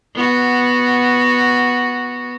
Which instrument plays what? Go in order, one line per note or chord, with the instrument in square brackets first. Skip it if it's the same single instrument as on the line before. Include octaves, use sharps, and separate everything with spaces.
[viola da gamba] B3 F#4